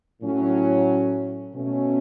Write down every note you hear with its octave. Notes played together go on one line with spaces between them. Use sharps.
A2 F#3 C#4
B2 A3 C#4